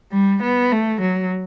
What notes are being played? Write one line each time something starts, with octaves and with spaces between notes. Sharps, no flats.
G3
B3
A3
F#3